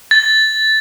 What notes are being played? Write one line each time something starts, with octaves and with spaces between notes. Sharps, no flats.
A6